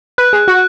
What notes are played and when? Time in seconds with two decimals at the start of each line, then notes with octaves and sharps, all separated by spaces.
0.18 B4 F#6
0.33 G#4
0.48 F#4 F#6